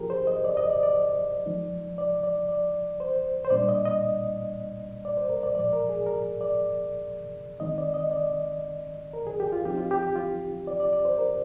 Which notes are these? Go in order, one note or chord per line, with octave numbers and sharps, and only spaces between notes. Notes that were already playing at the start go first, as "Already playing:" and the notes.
Already playing: F3 A#3 D4 F4 G4 G#4 A#4
C5
D#5
D5
D#5
D5
D5
F3 G#3 D#4
D5
D5
D5
C5
C5
A#2 G3 A#3 D4 D5
D#5
D#5
D5
C5
A#4
D5
A#2 F3 G#3 D5
A#4
G#4
A#4
D5
D#3 G#3 C4 D#4 D#5
D5
D#5
D5
A#4
G#4
G4
F4
F3 C4 D#4 G4
F4
G4
G4
F4
D5
D5
D5
C5
A#4